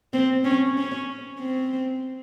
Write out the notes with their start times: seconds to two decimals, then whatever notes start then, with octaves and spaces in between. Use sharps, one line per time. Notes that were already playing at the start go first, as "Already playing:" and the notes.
0.13 C4
0.45 C#4
0.77 C#4
1.40 C4